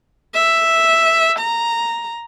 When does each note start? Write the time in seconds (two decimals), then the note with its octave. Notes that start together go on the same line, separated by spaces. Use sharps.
0.34 E5
1.39 A#5